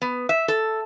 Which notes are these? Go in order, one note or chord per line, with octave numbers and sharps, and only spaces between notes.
B3
E5
A4